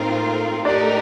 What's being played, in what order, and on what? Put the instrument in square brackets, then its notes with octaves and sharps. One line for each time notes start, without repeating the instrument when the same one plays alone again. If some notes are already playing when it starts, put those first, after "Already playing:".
Already playing: [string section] A2 A3 C4 F4 A#4 [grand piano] D#4
[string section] A2 A3 D#4 G4 A#4 [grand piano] D4 D5